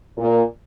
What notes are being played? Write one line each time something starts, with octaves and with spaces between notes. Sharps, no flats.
A#2